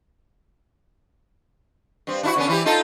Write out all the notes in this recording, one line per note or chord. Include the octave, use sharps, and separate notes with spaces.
G2 C4
D4 E4 F#4
D3 B3 C#4
E3 E4 G4
D#4 F4 A4